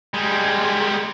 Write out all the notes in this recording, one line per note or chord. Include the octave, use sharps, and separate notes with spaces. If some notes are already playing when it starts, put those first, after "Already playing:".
G3 G#3